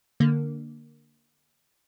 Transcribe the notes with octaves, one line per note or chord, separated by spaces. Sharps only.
D3 A#3